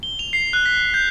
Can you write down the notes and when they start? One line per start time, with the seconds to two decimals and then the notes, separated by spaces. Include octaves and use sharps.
0.03 G7
0.19 F7
0.33 C7
0.53 F#6
0.65 B6
0.94 G6